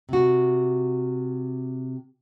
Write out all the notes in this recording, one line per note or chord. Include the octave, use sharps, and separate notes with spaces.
C3 F#4